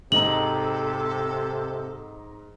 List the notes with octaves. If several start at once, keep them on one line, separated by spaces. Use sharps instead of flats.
G#2 C3 A4 D#5 A#5 F#7